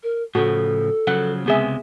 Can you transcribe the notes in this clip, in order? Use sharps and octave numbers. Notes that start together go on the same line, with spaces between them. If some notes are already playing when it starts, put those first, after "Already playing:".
A#4
A2 C#3 F3 F#4 A4
C#3 F3 F#3 F#5
C#2 C3 G#3 B3 G#4 E5